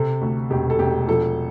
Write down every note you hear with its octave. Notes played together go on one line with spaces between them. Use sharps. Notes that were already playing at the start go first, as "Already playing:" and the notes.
Already playing: C3 A4
D2
E1 G4
A4
E1 G4
F3 A4